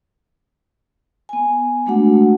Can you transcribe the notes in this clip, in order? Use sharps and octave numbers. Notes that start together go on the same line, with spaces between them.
B3 G#5
G#3 A3 D4 F#4 F#5